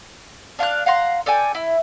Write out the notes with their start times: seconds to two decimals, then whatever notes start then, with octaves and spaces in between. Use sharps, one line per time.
0.59 D4 F5 F#5 F#6
0.86 F5 F#5 A#5 C6
1.26 A4 D5 G5 G#5
1.55 E4